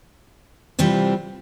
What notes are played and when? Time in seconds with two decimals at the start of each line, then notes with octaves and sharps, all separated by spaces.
0.79 C3 E3 G3 C4 F4